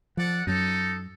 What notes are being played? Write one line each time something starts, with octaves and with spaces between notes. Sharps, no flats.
F3 A4 D5 F#5
F#2 F#3 D#4 A4